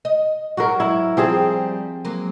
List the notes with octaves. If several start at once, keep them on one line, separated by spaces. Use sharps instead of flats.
D#5
G#2 F#3 F#4 A#4
E4
F3 G3 C4 G4 G#4
F#3 G#3 A#3